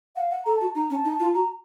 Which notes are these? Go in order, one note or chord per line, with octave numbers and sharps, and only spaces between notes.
F5 F#5
F#5
A4 A#5
A5
F#4
D#4 A#5
C#4
A5
D#4
A5
F4
F#4 A#5